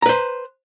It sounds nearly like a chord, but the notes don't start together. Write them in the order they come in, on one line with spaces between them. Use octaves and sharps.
A#5 B4 C5